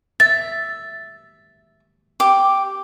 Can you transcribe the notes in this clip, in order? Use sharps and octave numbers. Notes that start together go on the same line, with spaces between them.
E5 A6
G4 D6